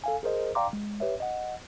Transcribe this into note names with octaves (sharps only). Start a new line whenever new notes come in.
A4 F5 G#5
G#4 A#4 C5 D#5
D5 F5 G5 A#5 C6 D6
G#3
G4 B4 C#5 E5
D#5 F#5